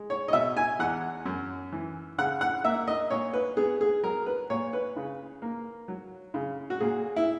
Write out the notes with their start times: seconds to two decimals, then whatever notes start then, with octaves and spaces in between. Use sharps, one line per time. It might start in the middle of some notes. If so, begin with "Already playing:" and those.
Already playing: G#3
0.10 C#5
0.28 D#5
0.33 B2 E5
0.57 G#5
0.79 E2 F#5
1.26 F#2
1.72 E3
2.18 C#3 F#5
2.41 F#5
2.64 A#3 E5
2.88 D#5
3.10 A#2 C#5
3.33 B4
3.57 B3 G#4
3.81 G#4
4.03 F#3 A#4
4.26 B4
4.50 A#2 C#5
4.73 B4
4.96 C#3
5.42 A#3
5.88 F#3
6.34 C#3
6.70 F#4
6.80 A#2 G#4
7.16 E4